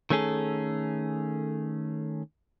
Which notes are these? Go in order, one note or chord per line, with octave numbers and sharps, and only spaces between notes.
D#3 A3 C#4 G#4 A4